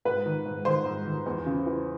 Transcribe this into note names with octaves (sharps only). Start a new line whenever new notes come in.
G#2 B4
D#3
G#2
D#3 C5
G#2
D#3
E2
C#3
E3